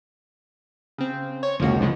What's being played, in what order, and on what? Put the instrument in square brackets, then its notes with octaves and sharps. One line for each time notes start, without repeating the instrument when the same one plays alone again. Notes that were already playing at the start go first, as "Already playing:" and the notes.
[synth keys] C#3 C4
C#5
[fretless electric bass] F1 C#2 [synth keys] F3 A#3 F#4
[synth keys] E3 F3 G#3